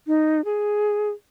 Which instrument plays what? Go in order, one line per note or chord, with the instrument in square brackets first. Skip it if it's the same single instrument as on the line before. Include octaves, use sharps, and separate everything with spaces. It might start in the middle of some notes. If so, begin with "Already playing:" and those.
[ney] D#4
G#4